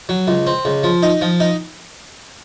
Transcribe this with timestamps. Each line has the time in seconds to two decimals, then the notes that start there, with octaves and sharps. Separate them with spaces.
0.09 F#3
0.28 C#2
0.47 C4
0.65 C#2
0.83 F3
1.03 D#4
1.21 F3
1.40 D#4